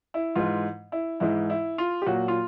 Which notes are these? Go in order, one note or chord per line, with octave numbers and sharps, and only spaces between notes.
E4
G#2 E3 G#3 F4
E4
G#2 E3 G#3 E4
E4
F4
G4
A#2 F#3 F#4
F4